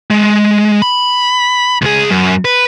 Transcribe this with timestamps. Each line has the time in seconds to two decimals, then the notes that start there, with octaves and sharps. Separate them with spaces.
0.10 G#3
0.82 B5
1.82 C#2 G#4
2.11 F#2
2.45 B4